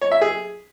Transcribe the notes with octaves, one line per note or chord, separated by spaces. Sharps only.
C#5
E5
G#4